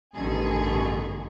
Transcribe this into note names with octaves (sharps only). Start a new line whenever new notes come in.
A1 G2 B2 D3 D#3 G#4